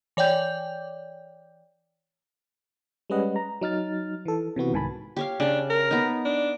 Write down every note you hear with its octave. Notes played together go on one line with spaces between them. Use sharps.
E3 C#5 D5 G5 G6
G3 G#3 C#4 B4 D#5 F#5
A#5
F#3 D#4 F6 A6
E3 A4
C3 E3 B3 F#4
C2 G#2 D#3 G#5 A5 B5
G4 C#5 F5
C#3 D4 A5
A#4
B3 D#4
D4